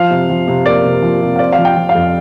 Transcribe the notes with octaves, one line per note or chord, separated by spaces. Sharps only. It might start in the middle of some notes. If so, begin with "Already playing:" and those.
Already playing: F3 F5
C3
F3
C3
A#3 D5
C3
F3
C3
F5
C4 D5
F5
F3
G5
F3
F5
F2